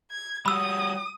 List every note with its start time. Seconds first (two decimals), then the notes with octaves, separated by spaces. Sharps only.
0.11 G#6
0.46 G3 F#4 B5 D#6 E6